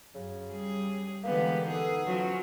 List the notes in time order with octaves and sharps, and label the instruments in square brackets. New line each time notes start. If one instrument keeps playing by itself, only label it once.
[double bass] F#2 [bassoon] C#3
[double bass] G3 [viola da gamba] G#4
[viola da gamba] D3 B3 G4 [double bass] E3 G#3 [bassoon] A#3 [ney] B4
[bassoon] B3 [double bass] D#4 [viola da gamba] G#4 [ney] A4
[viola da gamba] F3 F#3 [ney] C#4